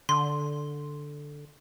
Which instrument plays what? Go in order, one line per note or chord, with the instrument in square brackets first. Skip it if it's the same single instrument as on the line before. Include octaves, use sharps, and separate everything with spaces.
[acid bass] D3 [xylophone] C6